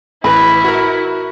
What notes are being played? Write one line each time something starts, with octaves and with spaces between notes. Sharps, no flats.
A1 E4 B4 B5
F#4 A#4